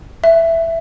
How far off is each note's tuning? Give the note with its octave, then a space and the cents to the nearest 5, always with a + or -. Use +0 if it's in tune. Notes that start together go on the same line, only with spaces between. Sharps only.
E5 +5